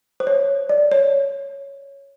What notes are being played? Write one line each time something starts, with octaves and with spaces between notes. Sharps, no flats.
C5
C#5
D5
C#5